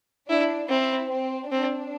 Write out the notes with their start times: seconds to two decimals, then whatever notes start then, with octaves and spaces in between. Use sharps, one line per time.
0.29 D4 E4
0.69 C4 E4
1.10 C4
1.51 C4 D4